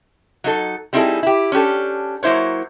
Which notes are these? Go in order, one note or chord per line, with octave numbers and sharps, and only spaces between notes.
F#3 D#4 A4
G3 C4 D#4 E4 G#4 A4
E4 G4
C#4 D4 G4 A4
F#3 A#3 E4 C5 C#5